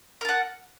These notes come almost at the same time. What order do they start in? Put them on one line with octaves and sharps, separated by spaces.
A#4 A5 F#5